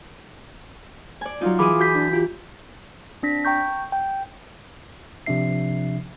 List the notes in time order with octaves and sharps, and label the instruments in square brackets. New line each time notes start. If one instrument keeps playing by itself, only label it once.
[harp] D5 G#5
[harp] F#3 D#4 [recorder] F4
[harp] E3 D#6 [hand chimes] G#4 B5 D6
[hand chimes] F#4 G6 B6
[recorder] D4
[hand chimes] F4 [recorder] G4
[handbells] C4 D4 A#6 B6
G5 A#5 C#6 G6
G5
[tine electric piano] C3 F3 D4 E5 C7